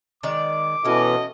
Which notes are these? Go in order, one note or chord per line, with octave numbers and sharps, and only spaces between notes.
D#3 G#3 D5 D6
B2 E3 C#4 E4 F#4 A4 D#5